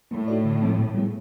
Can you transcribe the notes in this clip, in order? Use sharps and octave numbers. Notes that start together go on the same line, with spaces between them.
A2 A#3
D#4 F#4 A4 D5
D3
F3 G#3 C4
A#2
G3 B3 E4 G#4